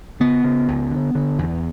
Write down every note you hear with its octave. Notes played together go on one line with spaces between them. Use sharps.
C#3 B3
C#3
C#2
D3
D3
E2